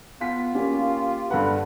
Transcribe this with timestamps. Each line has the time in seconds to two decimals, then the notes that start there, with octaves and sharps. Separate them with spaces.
0.21 B3 F4 B6
0.55 A#3 C#4 G4
1.31 G2 A4 B4 F#5